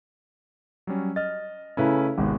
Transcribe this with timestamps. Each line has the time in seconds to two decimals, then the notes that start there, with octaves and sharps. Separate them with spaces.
0.87 F#3 G3 C#4
1.16 D#5 F6 A6
1.77 C#3 A3 C#4 E4 B4 A#5
2.18 G#1 C3 G#3 B3